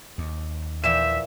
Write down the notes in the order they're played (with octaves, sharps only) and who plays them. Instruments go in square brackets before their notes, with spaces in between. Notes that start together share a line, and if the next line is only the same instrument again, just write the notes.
[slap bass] D#2
[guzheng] A#2 E3 F3 [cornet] E5 [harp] E7